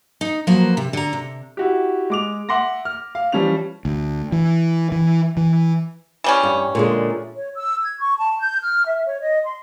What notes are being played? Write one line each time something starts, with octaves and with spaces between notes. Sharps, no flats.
D#4
F3 F#3 A#3 B4 C5
C3
D3 A#5
C3
E4 F#4 G4
G#3 D6 F7
E5 F#5 C6 D6 A#6
F6
F5
E3 F3 G3 C#4 G4 F7
D2
E3
E3
E3
E3 G3 C#4
G2
A#2 D3 G#3
C#5
E6
G#6
C#6
A5
G6
F6
E5
C#5
D#5
C6